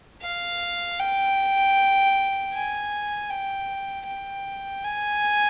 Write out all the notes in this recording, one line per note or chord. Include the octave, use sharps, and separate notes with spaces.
F5
G5
G#5
G5
G5
G#5